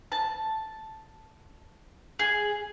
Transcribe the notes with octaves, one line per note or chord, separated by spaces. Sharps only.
A5
G#4